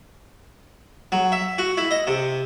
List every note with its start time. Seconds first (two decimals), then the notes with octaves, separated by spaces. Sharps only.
1.12 F#3
1.32 E5
1.58 F#4
1.77 E4
1.91 D#5
2.07 C3